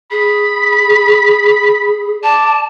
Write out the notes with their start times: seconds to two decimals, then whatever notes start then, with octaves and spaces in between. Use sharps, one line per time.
0.11 G#4 B5
2.23 D5 A5